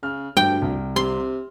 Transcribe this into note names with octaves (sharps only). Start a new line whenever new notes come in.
C#3 F6
D2 G2 G5
C2
C3 C6